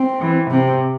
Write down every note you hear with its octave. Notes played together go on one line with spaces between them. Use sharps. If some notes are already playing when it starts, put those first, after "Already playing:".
Already playing: C4
E3
C3 C4